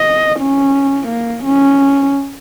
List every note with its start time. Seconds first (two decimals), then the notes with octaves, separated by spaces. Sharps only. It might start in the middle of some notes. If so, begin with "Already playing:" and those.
Already playing: D#5
0.40 C#4
1.08 A#3
1.44 C#4